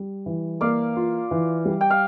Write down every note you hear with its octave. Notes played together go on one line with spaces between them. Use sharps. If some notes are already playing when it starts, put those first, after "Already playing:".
Already playing: G3
E3
A#3 D5 F5
F4
E3
G3
G5
F5